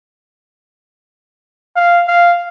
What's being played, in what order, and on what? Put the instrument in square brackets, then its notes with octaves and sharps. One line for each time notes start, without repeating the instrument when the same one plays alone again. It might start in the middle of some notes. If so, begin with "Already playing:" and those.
[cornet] F5
F5